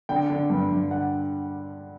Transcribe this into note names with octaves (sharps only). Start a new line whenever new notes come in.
D3 G5
D3
G2
G2
D3 F#5